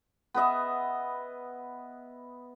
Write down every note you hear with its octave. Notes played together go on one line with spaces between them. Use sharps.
B3 B4 D#5 E5